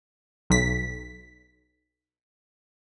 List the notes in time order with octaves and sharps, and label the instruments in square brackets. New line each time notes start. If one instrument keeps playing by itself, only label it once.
[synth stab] B1 B6